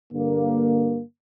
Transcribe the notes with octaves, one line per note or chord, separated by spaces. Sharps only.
G2 D3 A#3